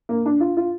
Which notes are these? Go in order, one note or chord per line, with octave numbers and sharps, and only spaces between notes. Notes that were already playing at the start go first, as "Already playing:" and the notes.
A#3
D4
F4
F4